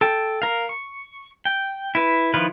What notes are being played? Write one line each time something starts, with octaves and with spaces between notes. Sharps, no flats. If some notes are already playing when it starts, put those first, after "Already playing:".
A4 G5
A#4 F5
C#6
G5
E4 B4
D#3 F3 E4 F4 B4